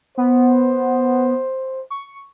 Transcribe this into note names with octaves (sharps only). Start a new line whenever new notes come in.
B3 C5
C#6